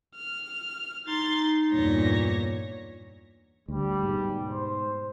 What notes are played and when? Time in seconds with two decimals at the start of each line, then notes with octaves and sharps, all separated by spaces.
0.16 F6
1.08 D#4 C6 A6
1.72 E2 G2 A#2 C#5 A#6
3.68 D2 G3
4.03 G#2 B2
4.49 C5